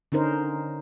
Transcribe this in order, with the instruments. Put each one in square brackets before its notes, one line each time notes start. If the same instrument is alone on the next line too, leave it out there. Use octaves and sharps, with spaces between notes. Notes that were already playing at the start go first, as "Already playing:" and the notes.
[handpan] D3 C#4 D#4 A#4 C5